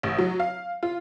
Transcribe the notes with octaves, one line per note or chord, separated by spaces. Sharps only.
A1
F#3
F5
F4